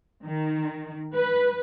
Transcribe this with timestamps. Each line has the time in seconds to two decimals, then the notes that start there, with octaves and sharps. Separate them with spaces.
0.24 D#3
1.14 B4